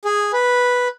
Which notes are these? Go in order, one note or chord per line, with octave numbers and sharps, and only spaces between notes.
G#4
B4